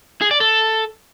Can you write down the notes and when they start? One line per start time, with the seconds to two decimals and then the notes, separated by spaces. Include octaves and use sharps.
0.21 G#4
0.31 D5
0.40 A4